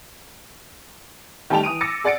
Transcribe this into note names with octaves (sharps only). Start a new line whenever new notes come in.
D#3 G3 A3 G5 A5 F7
E3 D#6 D7 D#7
D6 E6 A6 A#6 C#7
G#4 D5 F#5 A6 C#7 D7